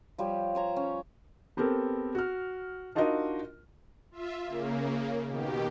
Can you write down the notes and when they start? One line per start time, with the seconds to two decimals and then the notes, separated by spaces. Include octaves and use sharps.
0.18 F3 G3 G4 C#5
0.55 C5 C#5 A#5
0.76 C#4
1.57 B3 C4 G4 A4 A#4
2.15 F#4 F6
2.95 D4 D#4 F4 F#4 A#4 D#5
4.11 F4 E5
4.44 C#3 A#3
5.26 B2 D#3 G4